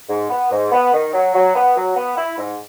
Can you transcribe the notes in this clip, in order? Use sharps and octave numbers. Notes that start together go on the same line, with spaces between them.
G#2
B3
G#2
B3
D#3
F#3
F#3
B3
F#3
B3
E4
G#2